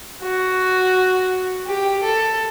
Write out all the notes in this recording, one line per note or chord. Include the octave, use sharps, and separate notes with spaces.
F#4
G4
A4